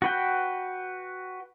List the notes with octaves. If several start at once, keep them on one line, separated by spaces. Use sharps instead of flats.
F#4 B4 G5